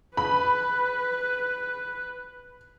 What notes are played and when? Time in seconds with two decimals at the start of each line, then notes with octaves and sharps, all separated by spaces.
0.17 B4 B5